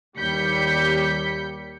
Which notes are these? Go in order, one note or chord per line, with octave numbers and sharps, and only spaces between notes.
D#2 G3 G6 B6 C#7